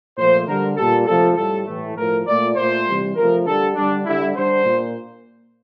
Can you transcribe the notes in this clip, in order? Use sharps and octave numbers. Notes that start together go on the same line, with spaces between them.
A#2 F3 A3 C5
D3 G3 A#4
A#2 G3 A4
C3 F3 A3 A4
A2 G3 A4
A2 E3 A3
A2 F3 A3 A#4
A#2 A3 D5
A#2 A3 C5
C3 E3 G3
C3 F3 A3 A#4
D3 G3 A4
D3 G3 D4
D3 G3 E4
D3 G3 C5
A#2